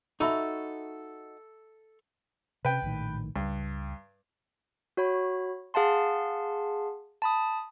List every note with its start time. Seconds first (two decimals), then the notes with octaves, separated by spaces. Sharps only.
0.20 D#4 F#4 A4 E5 B5 C#6
2.65 C3 C#4 B4 G5
2.82 A#1 A2 D#3
3.36 C#2 G2
4.97 F#4 C#5 B5
5.74 G#4 F5 F#5 A5 C6
7.22 A5 B5 D#6